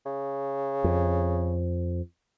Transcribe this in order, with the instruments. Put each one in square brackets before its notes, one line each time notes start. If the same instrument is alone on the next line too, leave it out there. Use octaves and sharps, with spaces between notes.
[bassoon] C#3
[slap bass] F2